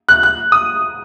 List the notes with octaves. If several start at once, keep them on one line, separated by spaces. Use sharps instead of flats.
F#6
F#6
D#6